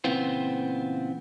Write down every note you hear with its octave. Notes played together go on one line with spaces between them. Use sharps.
A#2 C#3 E3 B3 C4 F4